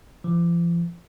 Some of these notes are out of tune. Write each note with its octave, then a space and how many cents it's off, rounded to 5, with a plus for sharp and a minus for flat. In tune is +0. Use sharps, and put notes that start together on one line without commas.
F3 -40